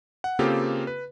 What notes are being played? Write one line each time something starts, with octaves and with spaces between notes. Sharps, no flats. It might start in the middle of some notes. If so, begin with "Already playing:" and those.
F#5
C#3 A#3 C4 F4 G4 A4
B4